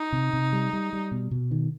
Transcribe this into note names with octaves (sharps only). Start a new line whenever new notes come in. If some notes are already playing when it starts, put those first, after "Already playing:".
Already playing: D#4
C3
C3
G3
G3
G3
B2
B2
D#3